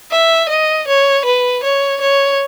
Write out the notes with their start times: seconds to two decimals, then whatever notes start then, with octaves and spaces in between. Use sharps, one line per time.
0.11 E5
0.49 D#5
0.87 C#5
1.25 B4
1.63 C#5
2.01 C#5